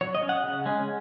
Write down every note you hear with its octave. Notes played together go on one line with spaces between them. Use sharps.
F#3 C#5
D#5
C#4
F#5
C#3
G#3 C#4